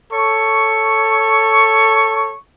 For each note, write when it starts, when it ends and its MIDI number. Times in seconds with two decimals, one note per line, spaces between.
0.13 2.34 69
0.13 2.34 73
0.13 2.34 85